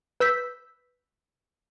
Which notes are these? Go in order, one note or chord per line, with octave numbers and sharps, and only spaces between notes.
B4 E6 G6 B6